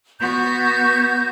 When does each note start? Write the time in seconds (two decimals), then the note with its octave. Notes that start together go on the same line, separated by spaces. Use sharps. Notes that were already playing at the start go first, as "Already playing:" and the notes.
0.21 B3 F#4 G6